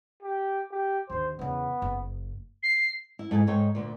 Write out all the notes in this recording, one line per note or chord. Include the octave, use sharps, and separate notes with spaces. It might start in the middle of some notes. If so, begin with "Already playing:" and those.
G4
G4
D#2 D3 C5
E2 C#3 B3
F#1
C7
E4
G#2 A4 G5 G#5
G#2 D#4 A4 C#5 G5
D2 A#2